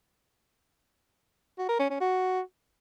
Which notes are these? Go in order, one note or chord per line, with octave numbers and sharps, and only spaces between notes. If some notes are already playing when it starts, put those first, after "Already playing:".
F#4
A#4
C#4
C#4
F#4